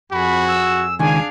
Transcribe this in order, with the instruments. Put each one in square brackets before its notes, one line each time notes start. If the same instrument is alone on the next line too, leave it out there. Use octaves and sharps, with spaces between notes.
[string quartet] F2 G#4 [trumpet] F#4 [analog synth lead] B5
[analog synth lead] E6
[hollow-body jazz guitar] C#2 D#3 [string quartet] D4 G#4 F5 [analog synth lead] G#5